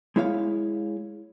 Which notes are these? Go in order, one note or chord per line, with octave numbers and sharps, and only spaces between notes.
G#3 E4 C#5 F5